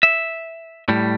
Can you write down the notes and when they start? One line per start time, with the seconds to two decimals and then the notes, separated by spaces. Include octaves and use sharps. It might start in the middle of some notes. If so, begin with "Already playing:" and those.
0.03 E5
0.89 A2 G3